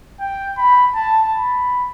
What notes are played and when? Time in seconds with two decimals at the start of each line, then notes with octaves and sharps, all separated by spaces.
0.20 G5
0.57 B5
0.95 A5
1.32 B5